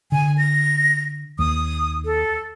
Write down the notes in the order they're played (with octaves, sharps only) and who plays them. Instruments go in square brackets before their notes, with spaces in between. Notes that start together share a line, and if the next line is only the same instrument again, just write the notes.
[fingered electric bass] D3 [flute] G#5
[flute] A#6
[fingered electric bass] D#2 [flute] D#6
[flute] A4